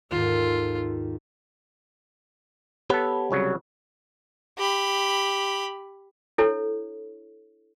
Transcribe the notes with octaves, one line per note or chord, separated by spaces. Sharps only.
D#2 G#2 F4 A4
B3 G4 A4 C#5 B5
C2 C#3 F#3
G4 B5
D4 E4 A4 C#5